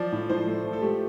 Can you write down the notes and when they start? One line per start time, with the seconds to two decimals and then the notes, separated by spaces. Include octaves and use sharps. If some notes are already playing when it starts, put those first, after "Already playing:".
Already playing: F3 D5
0.12 A2
0.29 A2 C5
0.47 A3
0.64 F3
0.73 A4
0.81 A3 G4